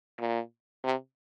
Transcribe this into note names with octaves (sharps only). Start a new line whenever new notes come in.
A#2
C3